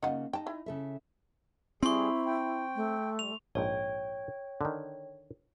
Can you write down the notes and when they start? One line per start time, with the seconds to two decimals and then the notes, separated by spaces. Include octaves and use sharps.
0.03 C#3 A#3 D#4 F4 F#5
0.33 D#4 G5 A5
0.47 E4
0.66 C#3 A4 E5
1.83 G3 C4 E4 G#4 C6 C#6
2.26 G5
2.76 A3
3.19 G3 F7
3.55 A#1 G#2 C#5 G5
4.61 D3 D#3